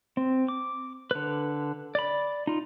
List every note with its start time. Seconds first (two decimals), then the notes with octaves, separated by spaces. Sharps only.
0.17 C4
0.48 D6
1.11 D3 B4
1.95 D5 B5
2.47 D#4 F4